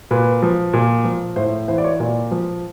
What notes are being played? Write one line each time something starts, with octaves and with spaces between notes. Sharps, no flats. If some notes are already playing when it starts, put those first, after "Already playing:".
A#2 B4
F3
A#2
F3
A2 C5
E3 C5
D5
C#5
A#2 D5
F3